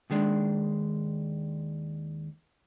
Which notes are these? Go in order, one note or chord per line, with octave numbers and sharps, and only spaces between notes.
D#2 D#3 G#3 D4